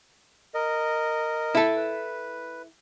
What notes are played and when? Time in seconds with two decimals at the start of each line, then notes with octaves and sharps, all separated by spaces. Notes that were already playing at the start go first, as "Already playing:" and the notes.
0.54 A#4 D#5
1.55 E4 A4
1.76 B4